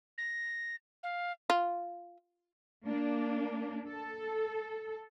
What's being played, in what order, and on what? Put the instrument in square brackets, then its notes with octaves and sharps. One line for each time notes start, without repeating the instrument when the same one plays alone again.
[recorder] A#6
F5
[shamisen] F4
[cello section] A#3 D4
A4